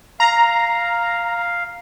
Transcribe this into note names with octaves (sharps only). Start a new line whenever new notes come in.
F5 A#5